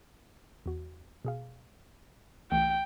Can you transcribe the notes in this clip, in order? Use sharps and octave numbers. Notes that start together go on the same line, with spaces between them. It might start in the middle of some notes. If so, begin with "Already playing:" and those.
E2 F#4
B2 G#4 F5
C2 E3 A3 G5